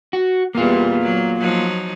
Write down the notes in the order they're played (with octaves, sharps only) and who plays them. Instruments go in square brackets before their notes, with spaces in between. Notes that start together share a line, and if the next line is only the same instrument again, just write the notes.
[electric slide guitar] F#4
[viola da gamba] E2 G3 B3 [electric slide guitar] A#3 F4
[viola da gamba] F#3
F3 F#3 D#4